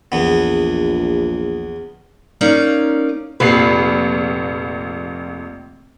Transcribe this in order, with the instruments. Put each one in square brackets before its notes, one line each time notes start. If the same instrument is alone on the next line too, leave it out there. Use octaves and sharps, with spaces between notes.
[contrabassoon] A#1 [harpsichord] E2 B3
[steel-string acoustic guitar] A#3 C#4 D#4 D5
[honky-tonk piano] F1 A#1 C7 [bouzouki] B4